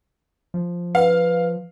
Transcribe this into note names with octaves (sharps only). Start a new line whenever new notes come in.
F3
B4 F5